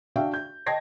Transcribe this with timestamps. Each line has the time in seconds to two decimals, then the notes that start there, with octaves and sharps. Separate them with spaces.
0.16 D4 F#4 D5 E5 F5 G5
0.34 G6
0.66 D#5 G5 A5 G#6 A#6 C7